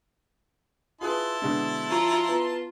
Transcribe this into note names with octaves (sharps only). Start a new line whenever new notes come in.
E4 F4 G#4 B4 A5 C6
B2 D3 G#3
F3 F4 A#5
B3 F4 A#5